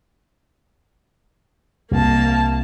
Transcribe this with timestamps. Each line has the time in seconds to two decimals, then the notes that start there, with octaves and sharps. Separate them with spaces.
1.91 C2 A#3 A5